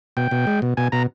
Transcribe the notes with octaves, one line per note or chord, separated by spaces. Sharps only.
B2 G5
B2
G#3
B2
B2 G#5
B2 A#5